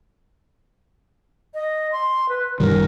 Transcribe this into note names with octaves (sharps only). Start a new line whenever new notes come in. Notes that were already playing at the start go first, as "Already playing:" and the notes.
D#5
C6
B4
F#1 D#3 G3 A#4